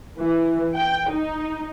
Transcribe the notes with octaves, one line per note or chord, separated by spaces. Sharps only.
E3
G5
D#4